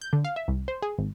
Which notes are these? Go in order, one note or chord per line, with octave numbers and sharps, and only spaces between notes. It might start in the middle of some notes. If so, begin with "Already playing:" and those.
G6
D3
F5
E5
C2
C5
G#4
G#1